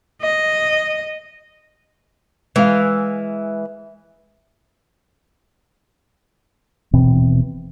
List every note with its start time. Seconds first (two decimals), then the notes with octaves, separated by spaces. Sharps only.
0.22 D#5
2.56 E3 G#3 F5
6.93 D#1 B2 E3 C4